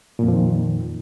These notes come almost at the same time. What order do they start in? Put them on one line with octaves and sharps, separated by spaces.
A#2 F2 F3 D#3